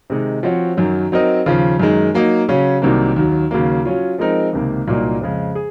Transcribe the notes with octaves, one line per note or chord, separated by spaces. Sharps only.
C3 D#3 G#3 D#4
F3 C4 F#4 C#5
F#2 D#3 F#3
F#3 C4 D#4 A#4 D#5
D#2 C#3 F3
F#2 D#3 G#3
F#3 A#3 D#4
C#3 F#3 C#4
C2 C3 D#3 F#3 A#3
D#2 D#3 F#3
D#2 C#3 F#3 A#3
F#3 C#4 F4
F3 G#3 C4 D#4 A#4
C#2 C3 D#3 A#3
C2 A#2 F#3 A#3 D#4
F2 C#3 G#3
G#4